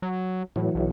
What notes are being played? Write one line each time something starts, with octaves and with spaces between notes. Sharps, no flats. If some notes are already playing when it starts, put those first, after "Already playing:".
F#3
A2 E3 F#3
B1